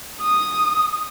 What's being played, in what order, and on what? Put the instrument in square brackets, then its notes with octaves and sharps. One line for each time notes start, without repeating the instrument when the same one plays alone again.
[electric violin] D#6